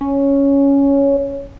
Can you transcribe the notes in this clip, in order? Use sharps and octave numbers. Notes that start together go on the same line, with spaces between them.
C#4